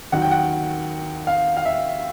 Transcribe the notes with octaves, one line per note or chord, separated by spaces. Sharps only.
D#2 D#3 F#3 F#5
G5
F#5
F5
F5
E5